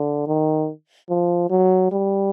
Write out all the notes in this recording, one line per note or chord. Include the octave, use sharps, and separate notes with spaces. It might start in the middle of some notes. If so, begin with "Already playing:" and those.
Already playing: D3
D#3
F3
F#3
G3